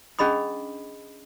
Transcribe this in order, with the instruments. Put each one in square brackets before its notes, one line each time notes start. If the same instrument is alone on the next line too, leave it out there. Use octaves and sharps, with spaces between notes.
[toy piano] C#4 D4 G#4 D#5 B5 D#6